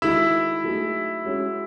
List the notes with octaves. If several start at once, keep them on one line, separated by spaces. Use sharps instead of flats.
D#3 G#3 D#4 E4 F#4 A4
F#3 A3 D#4 G#4
G#3 C#4 F#4 C#5